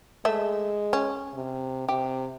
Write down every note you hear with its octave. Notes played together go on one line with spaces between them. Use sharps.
G#3 A3 E5
C#4
C3
C3 G4